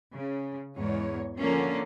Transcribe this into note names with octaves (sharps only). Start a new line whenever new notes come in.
C#3
E2 G#2 C#5
D3 F3 A#3 C#4